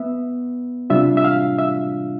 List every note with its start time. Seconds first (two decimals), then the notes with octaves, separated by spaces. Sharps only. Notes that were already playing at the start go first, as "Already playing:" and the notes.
Already playing: B3 E5
0.90 C3 G3 D4 F4 E5
1.17 E5
1.24 F5
1.59 E5